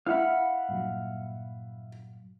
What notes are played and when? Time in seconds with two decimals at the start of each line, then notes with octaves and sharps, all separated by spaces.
0.06 E4 F5 F#5 B5
0.69 G2 A#2 F#3